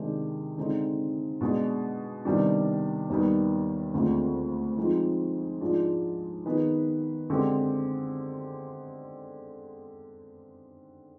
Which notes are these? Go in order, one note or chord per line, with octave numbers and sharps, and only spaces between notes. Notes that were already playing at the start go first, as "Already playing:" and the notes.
Already playing: C3 D#3 G#3 D4 G4
D3 G#3 C4 D#4
B2 G#3 D4
C3 D#3 G3 B3 D4
D#2 D#3 G3 B3
D2 D3 G#3 C4 F4
F3 G#3 C4 D#4
G#2 F3 G#3 D4 F4
D#3 B3 D#4 G#4 B4
D3 G#3 C4 G4